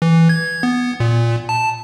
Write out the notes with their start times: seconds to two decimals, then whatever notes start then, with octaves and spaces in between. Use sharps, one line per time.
0.02 E3
0.29 G#6
0.63 B3
1.00 A#2
1.49 A5